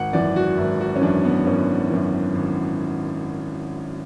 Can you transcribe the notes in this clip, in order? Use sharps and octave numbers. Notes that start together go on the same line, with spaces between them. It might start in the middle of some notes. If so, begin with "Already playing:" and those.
Already playing: G#1 F#5
F#2 E3 D5
F#4
G#1 E4
F#4
C#4
F#2 E3 D4
B3
G#1 C#4
F#2 E3
G#1